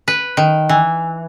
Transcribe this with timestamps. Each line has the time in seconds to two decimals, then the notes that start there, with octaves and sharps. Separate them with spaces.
0.08 B4
0.37 D#3
0.69 E3